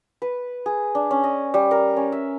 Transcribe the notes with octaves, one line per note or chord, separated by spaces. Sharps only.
B4
G#4
D4
C#4
D#5
G3
A#4
C#4
E5